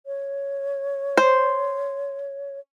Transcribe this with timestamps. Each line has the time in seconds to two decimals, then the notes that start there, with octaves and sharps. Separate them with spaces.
0.06 C#5
1.17 C5